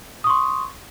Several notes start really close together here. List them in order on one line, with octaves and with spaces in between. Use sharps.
D#6 C#6 C6